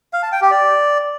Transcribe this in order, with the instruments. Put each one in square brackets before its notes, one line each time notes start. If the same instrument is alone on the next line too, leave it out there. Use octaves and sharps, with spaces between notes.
[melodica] F5
A5
G5
G4
D5